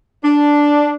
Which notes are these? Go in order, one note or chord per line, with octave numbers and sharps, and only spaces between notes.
D4